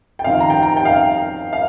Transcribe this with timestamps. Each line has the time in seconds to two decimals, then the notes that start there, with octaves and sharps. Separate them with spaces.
0.19 G5
0.24 F2 D#3 C4 F5
0.40 A#5
0.50 G5
0.63 A#5
0.77 G5
0.85 F5
0.93 G5
1.53 F5